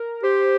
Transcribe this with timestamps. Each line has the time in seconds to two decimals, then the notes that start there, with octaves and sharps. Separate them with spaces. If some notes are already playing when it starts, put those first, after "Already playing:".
Already playing: A#4
0.23 G4 C5